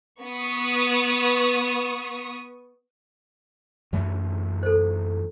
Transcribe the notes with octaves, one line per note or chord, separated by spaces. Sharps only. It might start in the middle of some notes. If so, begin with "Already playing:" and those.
B3 C#6 D#6
F#2 E3 A3
A4 C5